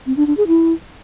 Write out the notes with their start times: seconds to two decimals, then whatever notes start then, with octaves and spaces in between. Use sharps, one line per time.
0.07 C4
0.17 D4
0.27 D4
0.37 G#4
0.47 E4